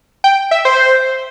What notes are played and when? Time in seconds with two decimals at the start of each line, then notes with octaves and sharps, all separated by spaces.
0.24 G5
0.51 E5
0.65 C5